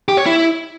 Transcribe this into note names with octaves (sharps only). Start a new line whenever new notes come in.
G4
C#5
E4